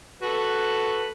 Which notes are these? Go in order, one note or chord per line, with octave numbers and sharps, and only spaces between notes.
F#4 A4 B4